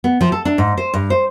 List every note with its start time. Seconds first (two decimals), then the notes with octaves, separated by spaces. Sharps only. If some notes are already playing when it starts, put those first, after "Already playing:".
0.04 B3
0.21 F3
0.32 A4
0.45 D4
0.58 G#2
0.77 C5
0.94 G2
1.10 C5